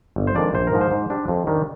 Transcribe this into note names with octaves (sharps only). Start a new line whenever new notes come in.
G1
C5
F2 D#3 G#3 D4 D5
A#1 C5
A#4
G#2 F3
C5
G#2
G3 D4
F2
D#3 G3 D4